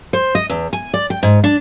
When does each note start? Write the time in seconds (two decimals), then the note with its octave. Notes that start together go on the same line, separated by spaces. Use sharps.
0.13 C5
0.35 D#5
0.50 E2
0.73 G#5
0.94 D5
1.10 G5
1.23 G#2
1.44 D4